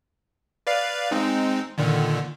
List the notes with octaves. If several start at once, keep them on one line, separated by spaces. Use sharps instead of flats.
B4 D5 F5
G#3 C4 D#4
A#2 D3 D#3